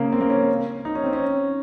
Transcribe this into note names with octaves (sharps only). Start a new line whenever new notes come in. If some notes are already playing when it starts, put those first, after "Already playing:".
Already playing: C#3 A#3
C4
A#3
C#4
D#4
C#4
C4
C#4